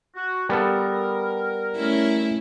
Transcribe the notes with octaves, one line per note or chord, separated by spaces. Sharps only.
F#4
G3 B3 A4 A#4
A3 C#4 E4